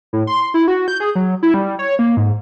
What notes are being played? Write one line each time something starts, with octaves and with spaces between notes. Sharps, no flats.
A2
C6
E4
F#4
G6
G#4
F#3
E4
G3
C#5
A#3
G#2